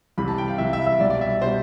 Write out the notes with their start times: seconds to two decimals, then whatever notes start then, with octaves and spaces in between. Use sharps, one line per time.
0.18 C2 C3 E3 B5
0.28 A5
0.38 G5
0.48 F5
0.58 C2 C3 E3 E5
0.73 E5
0.86 E5
1.00 C2 B2 G3 D5
1.10 D5
1.21 E5
1.42 B2 G3 C5